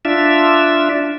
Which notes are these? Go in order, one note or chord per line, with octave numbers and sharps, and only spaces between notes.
D4 F4 E5